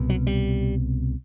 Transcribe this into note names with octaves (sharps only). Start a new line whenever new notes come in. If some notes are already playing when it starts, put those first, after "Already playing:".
Already playing: C2 B2
F#3
G3